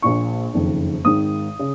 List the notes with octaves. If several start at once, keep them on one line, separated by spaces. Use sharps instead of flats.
A#1 A#2 C#6
F#1 F2 D#3
G#1 G#2 D#3 D#6
C#3